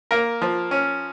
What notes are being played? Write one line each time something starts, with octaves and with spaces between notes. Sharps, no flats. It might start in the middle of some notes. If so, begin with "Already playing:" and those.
A#3 A#4
F3
C#4